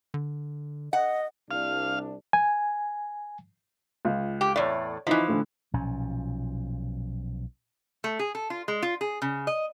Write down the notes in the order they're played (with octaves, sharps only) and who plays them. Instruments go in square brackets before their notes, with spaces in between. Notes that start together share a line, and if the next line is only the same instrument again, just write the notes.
[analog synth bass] D3
[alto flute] D#5 [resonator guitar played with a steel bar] F#5
[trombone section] C2 D4 [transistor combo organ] F5
[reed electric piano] G#5
[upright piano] C#2 F4
[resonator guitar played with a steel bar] G4
[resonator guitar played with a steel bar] E2 A2 [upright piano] C#5 D5
[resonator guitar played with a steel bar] E3 F3 [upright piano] D#4 E4
[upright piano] A2 D3
[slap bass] B1 A#2 F3 C#4
[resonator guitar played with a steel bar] A3
G#4
A4
F4
G#3
F4
G#4
C#3
D#5